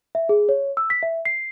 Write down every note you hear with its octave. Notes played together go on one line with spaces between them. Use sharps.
E5
G#4
C#5
E6
B6
E5
C7